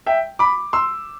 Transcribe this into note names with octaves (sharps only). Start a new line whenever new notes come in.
E5 G5
B5 D6
C6 E6